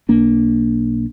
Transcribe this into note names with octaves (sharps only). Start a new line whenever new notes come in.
B1 A#3 D4